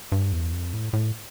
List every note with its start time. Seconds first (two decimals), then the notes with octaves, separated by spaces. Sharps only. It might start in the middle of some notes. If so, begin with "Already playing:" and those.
0.12 G2
0.32 E2
0.53 F2
0.73 A2
0.93 A2